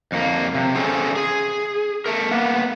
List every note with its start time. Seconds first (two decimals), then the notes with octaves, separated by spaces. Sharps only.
0.12 F2 A#3
0.55 C3
0.75 C#4 G#4 A4 C5
1.16 G#4
2.06 A3 A#4
2.31 A#3 B3